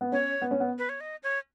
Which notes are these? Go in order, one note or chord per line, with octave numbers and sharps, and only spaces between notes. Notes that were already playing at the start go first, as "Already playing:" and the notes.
B3
C#4 C#5
B3
C#4
B3
B4
C#5
D#5
C#5